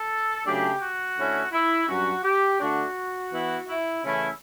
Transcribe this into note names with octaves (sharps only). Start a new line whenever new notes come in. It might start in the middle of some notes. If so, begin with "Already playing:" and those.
Already playing: A4
C#3 F#3 A3 D4 G4
F#4
D3 A3 C#4 E4
E4
G2 F#3 C#4 F#4
G4
D3 A3 D4 F#4
E3 B3 E4
E4
C#3 E3 A3 C#4 E4